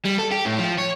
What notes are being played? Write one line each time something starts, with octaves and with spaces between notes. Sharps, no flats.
G3
A4
G4
A2
F3
C#5